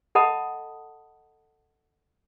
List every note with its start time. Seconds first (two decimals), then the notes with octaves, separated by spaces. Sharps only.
0.15 A4 D#5 F#5 A5 B5 D#6